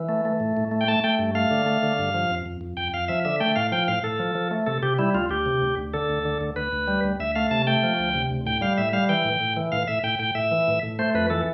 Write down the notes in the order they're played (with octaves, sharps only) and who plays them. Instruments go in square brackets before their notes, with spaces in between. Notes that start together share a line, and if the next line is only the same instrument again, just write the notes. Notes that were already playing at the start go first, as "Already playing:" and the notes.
Already playing: [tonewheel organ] E3
A3
A3
A2
A2
A3
G5
A3 A5
A3 G5
G2
A3 F5
D3
A3
D3
G2
F3
F2
F2
F2
F2 G5
F2 F5
F3 E5
D3 E5
A3 G5
A2 F5
F3 G5
A2 F5
A2 A4
F3
F3
A3
C3 A4
C3 G4
G3 E4
D2 F4
D2 G4
C3
D2
D2
D3 A4
D2
D3
D2
D2 B4
D2
G3
D2
D2 E5
A3 F5
C3 A5
A3 G5
F3
D2
C3
D2
A2 G5
G3 F5
A2 E5
G3 F5
E3 G5
A2
A2
E3
A2 F5
A2 E5
A2 G5
A2 G5
A2 E5
E3
A2
A2
A3 C5
F2 B4
E3 A4